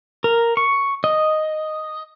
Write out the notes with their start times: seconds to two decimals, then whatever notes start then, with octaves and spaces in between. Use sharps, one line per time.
0.24 A#4
0.57 C#6
1.04 D#5